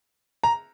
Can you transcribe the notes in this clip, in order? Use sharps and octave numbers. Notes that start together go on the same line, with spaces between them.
A#5